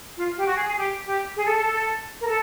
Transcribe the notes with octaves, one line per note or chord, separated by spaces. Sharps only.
F4
G4
F#4
G#4
G#4
G4
G4
G#4
A4
A4
A4
A#4
A4